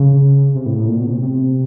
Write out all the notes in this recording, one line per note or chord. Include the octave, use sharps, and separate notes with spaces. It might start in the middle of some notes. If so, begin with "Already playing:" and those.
Already playing: C#3
C3
A2
A2
A#2
B2
C#3
C3
C3